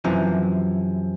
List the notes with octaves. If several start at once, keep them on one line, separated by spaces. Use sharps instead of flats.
F#2 C3 E3 F3